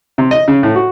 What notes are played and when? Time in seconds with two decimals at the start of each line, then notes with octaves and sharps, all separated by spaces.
0.18 C3
0.31 D#5
0.48 C#3
0.63 A2
0.75 F#4